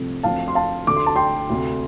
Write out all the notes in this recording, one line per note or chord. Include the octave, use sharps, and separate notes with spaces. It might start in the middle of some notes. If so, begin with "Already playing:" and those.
Already playing: C2 C3 F3 A3 C4
D2 D3 F3 A3 C4 F5 A5
C6
F5 A5
D2 D3 A3 D6
C6
A5
G5 C6
D2 C3 A3